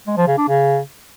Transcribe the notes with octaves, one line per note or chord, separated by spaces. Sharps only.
G#3
F3
C#3
D4
C#3